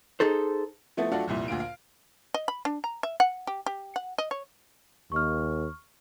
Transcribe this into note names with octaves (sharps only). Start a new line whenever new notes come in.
D#4 G#4 A4 C5
F3 A3 B3 E4
F#3 A3 D4 F4 F#4 A4
F1 C2 A#2 E4
D2 A#2 F4 D7
F5
D#5
B5
D4
A#5
E5
F#5
G4
G4
F#5
D#5
C#5
D#2 C#6 F6